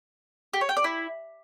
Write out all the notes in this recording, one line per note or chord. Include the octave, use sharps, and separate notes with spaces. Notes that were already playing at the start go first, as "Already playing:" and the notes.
G4
C#5
G5
D5
E4